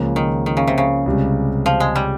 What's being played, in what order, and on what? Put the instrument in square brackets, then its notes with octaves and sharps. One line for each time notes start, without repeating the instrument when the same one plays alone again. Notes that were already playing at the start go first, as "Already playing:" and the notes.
Already playing: [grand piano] C#2 C#3 F3 A#3
[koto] D#3
D#3
C#3
C3
C#3
[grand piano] C#2 C3 G3
[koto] F3
G#3
G3